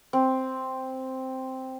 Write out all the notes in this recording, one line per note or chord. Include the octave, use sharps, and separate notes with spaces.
C4